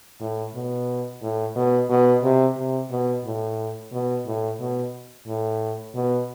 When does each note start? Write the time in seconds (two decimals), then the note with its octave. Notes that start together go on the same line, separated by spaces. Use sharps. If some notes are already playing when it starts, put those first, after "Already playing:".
0.20 A2
0.55 B2
1.22 A2
1.56 B2
1.90 B2
2.23 C3
2.57 C3
2.91 B2
3.25 A2
3.92 B2
4.26 A2
4.60 B2
5.27 A2
5.95 B2